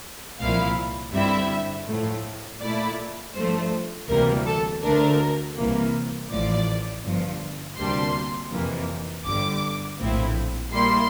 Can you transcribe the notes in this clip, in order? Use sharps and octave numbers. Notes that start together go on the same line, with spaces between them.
C2 A#2 F3 A#3 E4 F5
G2 D3 G3 C4 E4 E5
A2 F3 A3
A#2 A3 E4 D5
G2 F3 A3 C5
D2 C3 E3 G3 A#3 A#4
A4
D2 D3 A3 D4 A#4
C2 C3 E3 A#3
A1 A2 F3 D5
G1 G2 F3
D2 C3 G3 A#3 D4 C6
F2 C3 E3 A#3
G1 G2 D3 G3 D6
A#1 A2 F3 C4 E4
A#2 G3 A#3 E4 C6